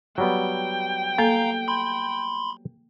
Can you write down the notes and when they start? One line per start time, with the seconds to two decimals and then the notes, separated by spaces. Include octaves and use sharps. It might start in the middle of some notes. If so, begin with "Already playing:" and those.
0.18 F#3 G3 B3 G5
1.18 A#3 A4 F5 A#5
1.68 B5 C6